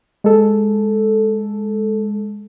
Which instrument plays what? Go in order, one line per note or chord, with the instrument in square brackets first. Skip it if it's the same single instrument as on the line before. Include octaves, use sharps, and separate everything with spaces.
[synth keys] G#3 A4